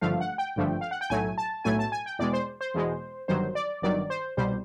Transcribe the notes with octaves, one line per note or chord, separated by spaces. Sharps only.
G#1 G2 D3 F3 A3 F5
F#5
G5
G#1 G2 D3 F3 A3
F5
F#5
G5
B1 A2 F#3 A3 G#5
A5
B1 A2 F#3 A3 G#5
A5
G#5
G5
E2 B2 G#3 D5
C5
C5
E2 B2 G#3
G1 G2 D#3 F#3 C5
D5
G1 G2 D#3 F#3 D5
C5
C2 B2 G3 C5